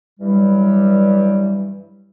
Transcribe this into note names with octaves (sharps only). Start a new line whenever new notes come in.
G2 E3 F#3 G3